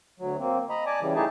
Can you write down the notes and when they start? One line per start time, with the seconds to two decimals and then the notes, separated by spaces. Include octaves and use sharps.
0.19 D2 F#3
0.39 A#3 C4
0.70 D#5 A#5 B5
0.86 D5 G#5 A5 D6
1.01 C#3 E3 G3
1.15 A3 D#4 E4 G4 G#4 A5